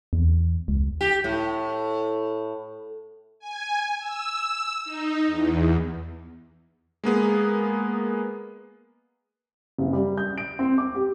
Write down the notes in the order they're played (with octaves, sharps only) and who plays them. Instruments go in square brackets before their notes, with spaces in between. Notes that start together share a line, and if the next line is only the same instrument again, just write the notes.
[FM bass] E2
C#2
[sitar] G4
A2
[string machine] G#5
E6
D#4
E2
[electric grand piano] G#3 A#3 B3 G#4
[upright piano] F#1
G3
G6
D7
C4
D6
G4